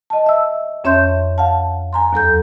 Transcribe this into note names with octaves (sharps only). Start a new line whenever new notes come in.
D#5 A5
E5 E6
F2 C#4 C#5 E5 C6 G6
F5 F#5 A5
G#5 A#5 C6
D#2 F#3 A4 G6